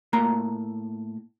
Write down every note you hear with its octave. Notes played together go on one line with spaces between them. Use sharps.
A2 A#3 A#5